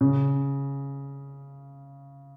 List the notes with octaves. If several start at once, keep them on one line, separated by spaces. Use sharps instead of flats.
C#3